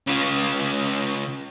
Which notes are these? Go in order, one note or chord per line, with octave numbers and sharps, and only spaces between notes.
C#3 F4